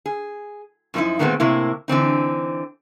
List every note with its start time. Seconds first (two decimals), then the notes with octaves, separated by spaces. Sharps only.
0.06 G#4
0.94 F#2 F3 A3 C4 D#4 E4
1.19 A#2 D#3 G#3 A3 B3 C4
1.40 A2 C3 A#3 E4
1.88 D3 E3 C4 D#4